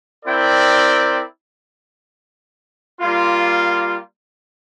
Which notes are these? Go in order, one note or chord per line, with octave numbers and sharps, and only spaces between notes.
C4 E4 A#4 D5 G5
G3 A#3 F4